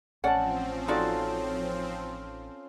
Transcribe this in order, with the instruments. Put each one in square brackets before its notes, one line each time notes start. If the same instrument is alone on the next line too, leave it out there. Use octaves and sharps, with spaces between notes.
[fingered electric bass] A1 [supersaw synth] F3 C4 [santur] C#4 A5 [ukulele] D5 F#5
[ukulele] D#4 F#4 D5 [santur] F4 A4